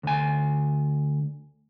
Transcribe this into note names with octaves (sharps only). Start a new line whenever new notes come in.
D2 G#5